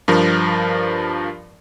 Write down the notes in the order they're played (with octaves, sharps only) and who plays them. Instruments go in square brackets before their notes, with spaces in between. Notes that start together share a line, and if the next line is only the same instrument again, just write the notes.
[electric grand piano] G2 F3 A#4